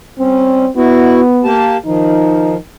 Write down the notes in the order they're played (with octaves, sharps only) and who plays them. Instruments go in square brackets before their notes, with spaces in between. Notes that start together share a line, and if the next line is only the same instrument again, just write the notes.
[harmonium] G3 C#4 [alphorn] C4
[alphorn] B3 [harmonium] E4 F#4
[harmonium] A#3 G4 A5
[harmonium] D#3 F3 [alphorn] D#4